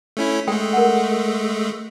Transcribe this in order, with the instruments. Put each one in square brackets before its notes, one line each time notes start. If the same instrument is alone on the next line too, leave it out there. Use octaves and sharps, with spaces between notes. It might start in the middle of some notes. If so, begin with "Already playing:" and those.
[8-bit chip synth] A3 C#4 E4
[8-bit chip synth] G#3 A3 [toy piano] A4 G5
[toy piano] A#4 F#5